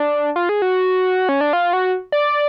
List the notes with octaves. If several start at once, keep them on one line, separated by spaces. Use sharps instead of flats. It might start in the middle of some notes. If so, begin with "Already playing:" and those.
Already playing: D4
F4
G#4
F#4
C#4
D4
F4
F#4
D5